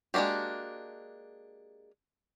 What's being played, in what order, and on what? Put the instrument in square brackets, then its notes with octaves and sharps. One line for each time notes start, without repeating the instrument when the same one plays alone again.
[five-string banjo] G#3 A#3 D4 F#4 G4